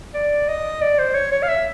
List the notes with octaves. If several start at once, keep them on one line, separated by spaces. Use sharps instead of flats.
D5
D#5
D5
C5
C#5
C#5
F5
E5